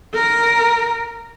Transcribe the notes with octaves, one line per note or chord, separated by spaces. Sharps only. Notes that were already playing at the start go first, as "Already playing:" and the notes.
A#4